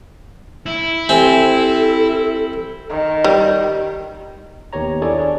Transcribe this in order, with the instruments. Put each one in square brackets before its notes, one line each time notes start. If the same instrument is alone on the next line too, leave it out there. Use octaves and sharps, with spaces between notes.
[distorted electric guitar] E4
[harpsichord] C4 [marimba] G4 E5 G#5 [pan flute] A4
[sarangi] D#3
[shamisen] G3
[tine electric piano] D#2 D#3 B3 G4 C#5 A#5
D4 E4 G#4 A4 C#5 D5
D4 G#4 D5